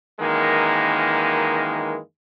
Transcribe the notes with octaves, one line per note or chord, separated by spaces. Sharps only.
F#2 D#3 E3 G#3 A#3